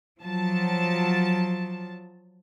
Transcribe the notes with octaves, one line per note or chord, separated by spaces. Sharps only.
F3 F#3 A5